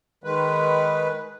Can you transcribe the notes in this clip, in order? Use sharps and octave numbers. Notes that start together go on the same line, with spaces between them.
D#3 G#3 B4